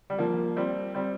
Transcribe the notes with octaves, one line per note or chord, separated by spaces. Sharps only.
G3
F3 A#3
G3 C4
G3 C4